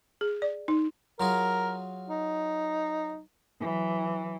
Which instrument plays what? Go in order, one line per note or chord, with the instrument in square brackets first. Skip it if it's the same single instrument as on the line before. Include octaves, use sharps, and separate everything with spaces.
[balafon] G#4
D5
D#4
[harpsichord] F#3 F4 G#4 [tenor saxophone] A#4
[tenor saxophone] D#4
[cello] E3 F#3